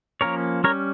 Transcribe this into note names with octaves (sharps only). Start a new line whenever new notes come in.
F3 A#3 C#4 A#4 C#5
G3 C#4 A#4 C#5